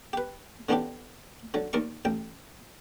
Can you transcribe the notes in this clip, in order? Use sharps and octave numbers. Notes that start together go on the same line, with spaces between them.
G4 B4
D3 E3 B3 C#4 D4 G4
D3 F#3
D#2 A#4 D5 C#6
A1 G5